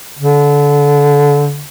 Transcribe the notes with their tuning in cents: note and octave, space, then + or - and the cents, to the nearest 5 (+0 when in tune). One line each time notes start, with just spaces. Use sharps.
D3 -25